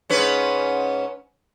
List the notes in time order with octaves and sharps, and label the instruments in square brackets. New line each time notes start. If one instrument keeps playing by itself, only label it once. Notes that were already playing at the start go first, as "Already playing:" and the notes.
[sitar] G#2 C#4 B4